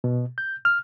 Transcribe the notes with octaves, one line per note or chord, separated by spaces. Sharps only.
B2
G6
F6